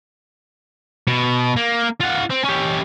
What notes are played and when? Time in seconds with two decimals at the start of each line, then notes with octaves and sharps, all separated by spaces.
1.07 B2
1.57 A#3
2.01 F4 F#5
2.31 C4
2.44 C#4 G4